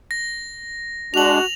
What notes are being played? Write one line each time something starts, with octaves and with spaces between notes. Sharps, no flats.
A#6
G#3 D4 F#4 F7 F#7